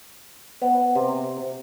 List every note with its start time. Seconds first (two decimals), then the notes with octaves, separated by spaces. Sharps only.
0.62 B3
0.95 C3